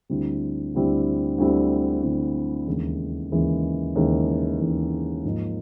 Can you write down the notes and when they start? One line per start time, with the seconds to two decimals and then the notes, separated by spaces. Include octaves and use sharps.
0.09 D2 D3 G3 C4 E4
0.74 D2 D3 G3 C4 E4
1.38 D2 D3 G3 C4 E4
2.02 D2 D3 G3 C4 E4
2.66 D#2 C#3 E3 G#3
3.32 D#2 C#3 E3 G#3
3.96 D#2 C#3 E3 G#3
4.59 D#2 C#3 E3 G#3
5.24 G#2 F3 A#3 D#4